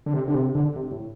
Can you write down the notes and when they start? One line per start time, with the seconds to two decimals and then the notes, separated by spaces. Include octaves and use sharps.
0.06 D3
0.13 C3
0.28 D3
0.34 C3
0.55 D3
0.76 C3
0.91 A2